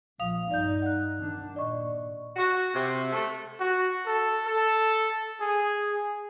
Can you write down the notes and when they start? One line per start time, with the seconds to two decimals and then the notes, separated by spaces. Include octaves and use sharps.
0.20 A#1 F3 F5 D#6 F7
0.51 G2 D#4 D5 G6
0.82 F#5 F#6
1.17 D#3 D4
1.56 A#2 D5 D#5 C#6
2.36 F#4
2.75 C3
3.13 A3
3.60 F#4
4.06 A4
4.46 A4
5.41 G#4